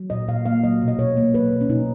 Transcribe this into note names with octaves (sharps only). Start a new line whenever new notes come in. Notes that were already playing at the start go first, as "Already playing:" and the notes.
Already playing: F#3
A#2 D#5
A#2 F5
A#3 F5
F#3 D#5
B2
D#5
B2 C#5
A#3
F#3 B4
B2
C#4
B2 D#4